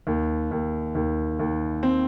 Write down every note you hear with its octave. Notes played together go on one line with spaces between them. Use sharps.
D#2
D#2
D#2
D#2
C4